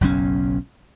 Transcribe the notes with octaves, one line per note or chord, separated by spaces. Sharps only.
F#1 B1 F#2 C#4